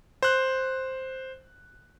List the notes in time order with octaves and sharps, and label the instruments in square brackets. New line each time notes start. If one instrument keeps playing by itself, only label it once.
[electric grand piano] C5 F#6